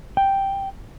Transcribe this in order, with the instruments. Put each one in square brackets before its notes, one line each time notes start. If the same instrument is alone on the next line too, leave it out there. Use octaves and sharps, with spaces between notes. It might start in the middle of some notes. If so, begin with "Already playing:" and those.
[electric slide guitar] G5